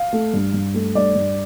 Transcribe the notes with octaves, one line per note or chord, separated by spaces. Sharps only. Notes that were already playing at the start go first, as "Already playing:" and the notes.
Already playing: F5
A3
G2
G2
A3
G2 D5
G2